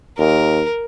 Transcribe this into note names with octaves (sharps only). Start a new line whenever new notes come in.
D#2 A#4